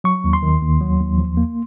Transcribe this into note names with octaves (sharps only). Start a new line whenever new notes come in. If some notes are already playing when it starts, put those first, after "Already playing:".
F#3 C#6
D#2
C6
D#3
D#2
F#3
D#2
F3
A#3